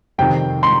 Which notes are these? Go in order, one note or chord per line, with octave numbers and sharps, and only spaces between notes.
F2 C3 D#3 G5
C6